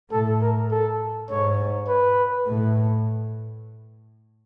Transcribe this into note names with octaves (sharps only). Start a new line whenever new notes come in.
A2 A4
A#4
A4
G#2 C#5
B4
A2